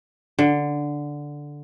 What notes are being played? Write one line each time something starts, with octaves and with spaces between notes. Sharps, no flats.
D3